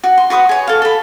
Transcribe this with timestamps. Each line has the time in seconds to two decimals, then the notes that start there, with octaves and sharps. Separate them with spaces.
0.04 F#4
0.18 C6
0.30 F#4 B4 C#6 D#6
0.49 G#4 C#5
0.67 A4 F5
0.82 A4 B5